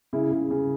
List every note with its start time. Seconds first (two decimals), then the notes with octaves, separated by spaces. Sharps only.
0.13 C#3 E4
0.31 C#3
0.51 C#3